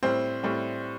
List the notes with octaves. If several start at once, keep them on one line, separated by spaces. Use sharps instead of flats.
A2 G3 C4 C5
A2 G3 C4